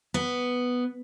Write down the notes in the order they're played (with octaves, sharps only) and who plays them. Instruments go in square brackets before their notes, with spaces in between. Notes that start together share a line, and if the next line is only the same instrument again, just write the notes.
[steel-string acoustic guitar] B3